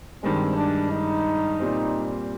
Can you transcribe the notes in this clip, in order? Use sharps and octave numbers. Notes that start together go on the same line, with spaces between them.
G2 D#3 G#3 C4
D4
D#4
A#2 G3 C4